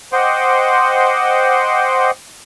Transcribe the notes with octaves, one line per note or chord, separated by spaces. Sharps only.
C5 D#5 F#5 G5 C6 D6